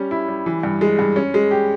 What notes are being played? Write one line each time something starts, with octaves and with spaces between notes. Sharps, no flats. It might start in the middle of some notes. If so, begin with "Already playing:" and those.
Already playing: G3 C#4
E4
G3
E3
G2
G#3
G2
C#4
G#3
G4